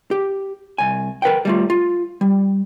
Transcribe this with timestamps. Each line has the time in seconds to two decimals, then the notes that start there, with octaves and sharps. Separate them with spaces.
0.11 G4
0.78 C2 G#5
1.22 A#4 B4 F#5 G5
1.45 G3 A3 F4
1.70 F4
2.21 G3